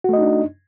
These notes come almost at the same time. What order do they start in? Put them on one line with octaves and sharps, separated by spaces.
F#4 A3 D#5 D#4 D4